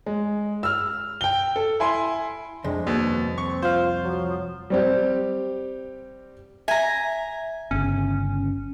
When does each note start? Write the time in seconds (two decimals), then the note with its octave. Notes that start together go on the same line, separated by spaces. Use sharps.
0.06 G#3
0.63 E6 F6
1.21 G5 G7
1.56 A4
1.80 E4 G#5 C6
2.64 C2 F2 G#3 D4
2.87 D#2 B2
3.38 C4 C#6
3.62 F4 C5 F5
4.04 F3 F#3
4.70 G3 C4 G4
6.68 E5 G#5 A#5
7.71 G1 C#3 C#4